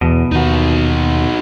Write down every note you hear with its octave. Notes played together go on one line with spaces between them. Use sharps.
E2 B2
D#2 D#4 F#4